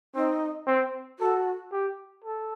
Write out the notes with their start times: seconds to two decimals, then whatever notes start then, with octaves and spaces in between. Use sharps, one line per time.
0.15 C4 D#4
0.67 C4
1.19 F#4 A4
1.72 G4
2.24 A4